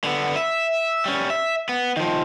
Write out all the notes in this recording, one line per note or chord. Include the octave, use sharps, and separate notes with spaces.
D3 B3
E5
G3 C#4
E5
B3
D#3 F3